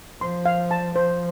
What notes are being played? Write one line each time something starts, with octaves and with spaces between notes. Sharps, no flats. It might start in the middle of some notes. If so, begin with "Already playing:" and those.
F3 C6
F5
A5
F3 C5